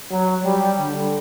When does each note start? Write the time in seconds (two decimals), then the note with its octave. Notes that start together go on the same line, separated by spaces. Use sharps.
0.11 F#3
0.44 G3
0.80 D3